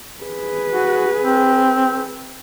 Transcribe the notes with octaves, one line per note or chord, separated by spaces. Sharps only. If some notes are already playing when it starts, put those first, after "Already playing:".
G#4 B4
F#4
C4